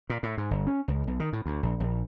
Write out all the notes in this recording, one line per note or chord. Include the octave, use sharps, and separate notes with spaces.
A#2
A2
G#2
G1
C#4
C#2
B1
D#3
A2
D2
A#1
A#1